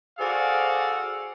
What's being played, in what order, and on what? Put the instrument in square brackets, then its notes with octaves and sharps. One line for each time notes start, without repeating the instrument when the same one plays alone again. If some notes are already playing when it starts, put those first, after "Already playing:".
[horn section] F#4 G#4 A4 C5 D5 F5